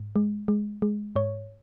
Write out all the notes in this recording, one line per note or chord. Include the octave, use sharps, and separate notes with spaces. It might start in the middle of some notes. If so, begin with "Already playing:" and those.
Already playing: G#2
G#3
G#3
G#3
G#2 C#5